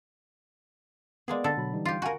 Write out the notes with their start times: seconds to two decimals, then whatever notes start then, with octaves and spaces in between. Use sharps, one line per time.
1.28 G#3 A#3 B3 G#4 D5
1.44 D3 A4
1.57 B2 F#3 B5
1.74 E3 G3 D#4
1.85 F4 G4
2.02 F#4 A#4 F5 G#5 B5